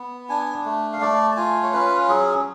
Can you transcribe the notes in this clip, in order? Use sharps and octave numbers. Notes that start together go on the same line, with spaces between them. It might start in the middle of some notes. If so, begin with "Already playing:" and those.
Already playing: B3
D4 G#5
A3
F5
A3 D5
A5
F4 G#5
C#5
C#4 B4
F#3 G#4